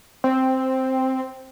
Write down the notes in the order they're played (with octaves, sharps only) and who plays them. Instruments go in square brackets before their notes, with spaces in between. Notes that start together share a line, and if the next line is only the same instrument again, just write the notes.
[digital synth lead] C4